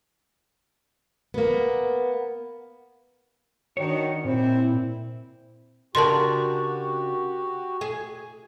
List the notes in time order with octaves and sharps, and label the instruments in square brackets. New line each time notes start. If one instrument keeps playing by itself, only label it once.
[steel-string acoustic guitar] A#3 B3
[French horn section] D#3 D4 [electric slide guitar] F#4 C#5
[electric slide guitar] A#2 [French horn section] C4 E4
[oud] C#3 D4 A#4 [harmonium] F#4 G4 [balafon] A5 C6
[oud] G#4